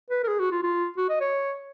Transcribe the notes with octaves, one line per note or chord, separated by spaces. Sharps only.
B4
A#4
G#4
F#4
F4
F4
F#4
D#5
C#5